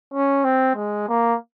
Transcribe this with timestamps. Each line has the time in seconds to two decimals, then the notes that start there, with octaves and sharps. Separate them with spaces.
0.14 C#4
0.44 C4
0.76 G#3
1.08 A#3